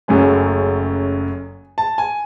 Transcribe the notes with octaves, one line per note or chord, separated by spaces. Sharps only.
F#1 F#2 C#3 F#3 A3 G#5
A5
G#5